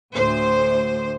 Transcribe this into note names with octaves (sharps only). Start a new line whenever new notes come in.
D2 A2 C5